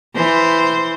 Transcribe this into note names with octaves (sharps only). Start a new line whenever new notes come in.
E3 C5